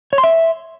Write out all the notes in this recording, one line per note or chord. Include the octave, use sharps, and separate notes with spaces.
C#5
C6
E5